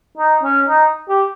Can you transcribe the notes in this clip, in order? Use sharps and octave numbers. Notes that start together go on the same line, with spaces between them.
D#4
C#4
D#4
G4